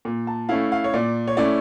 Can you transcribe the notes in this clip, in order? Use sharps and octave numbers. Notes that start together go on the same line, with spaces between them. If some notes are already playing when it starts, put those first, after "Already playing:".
A#2
A5
A3 C#4 E4 F5
F5
C#5
A#2 D5
C#5
A3 C#4 E4 D5